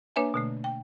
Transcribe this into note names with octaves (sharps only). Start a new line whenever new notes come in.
A#3 D4 B4 C#5 E5 G#5
B2 D3 A3
G5